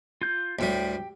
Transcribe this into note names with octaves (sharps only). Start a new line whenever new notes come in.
F4 G6
D2 A2 G3 G4 G5